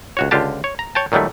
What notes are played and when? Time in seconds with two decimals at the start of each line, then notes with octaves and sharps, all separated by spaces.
0.17 C#2 F#4 C#5
0.31 C#2 D3 F4 G4 A5
0.64 C#5
0.79 A#5
0.95 C#5 G5 A5
1.12 A#2 D#3 F#3 G3 A3